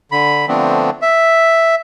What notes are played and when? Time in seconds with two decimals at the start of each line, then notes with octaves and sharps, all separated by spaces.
0.12 D3 B5
0.48 D3 F3 A3 B3 C4 D4
1.02 E5